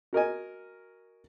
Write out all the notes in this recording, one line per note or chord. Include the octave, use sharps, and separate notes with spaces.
F#4 A#4 D#5 G#5